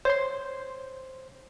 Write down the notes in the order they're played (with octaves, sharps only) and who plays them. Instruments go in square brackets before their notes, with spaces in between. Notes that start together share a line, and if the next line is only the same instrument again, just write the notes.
[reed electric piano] C5 C6 [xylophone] C#5